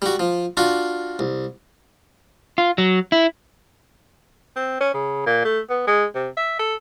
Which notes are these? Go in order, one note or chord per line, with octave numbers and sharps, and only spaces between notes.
G3 F#4
F3
D4 F4 F#4
C2
F4
F#3
E4
C4
C#4
C#3
A#2
A3
B3
G#3
C3
E5
A4